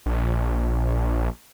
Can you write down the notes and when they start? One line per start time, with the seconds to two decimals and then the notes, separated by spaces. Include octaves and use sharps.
0.06 A#1